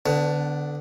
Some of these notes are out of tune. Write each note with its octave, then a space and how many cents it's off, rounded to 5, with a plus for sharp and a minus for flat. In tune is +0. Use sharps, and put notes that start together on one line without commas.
D3 +0 B3 +25